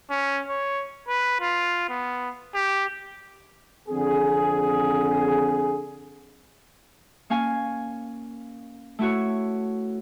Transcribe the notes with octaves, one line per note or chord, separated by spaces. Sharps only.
C#4
C#5
B4
F4
B3
G4
F2 D3 C4 G#4
A#3 C#4 F5 G#5
A3 E4 F#4 C#5